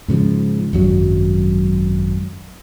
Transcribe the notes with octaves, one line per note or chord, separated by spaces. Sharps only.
G#2 C#3 E3 F3
G#1 F#2 F#3